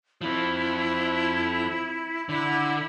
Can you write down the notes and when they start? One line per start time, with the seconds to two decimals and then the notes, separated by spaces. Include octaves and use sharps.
0.21 F3 C4 E4
2.29 D3 E4